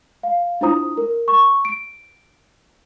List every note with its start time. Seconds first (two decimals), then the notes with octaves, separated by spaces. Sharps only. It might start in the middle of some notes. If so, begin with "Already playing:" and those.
0.23 F5
0.61 D4 E4 F4 C5 A#5 D#6
0.97 A#4
1.28 C#6
1.65 D7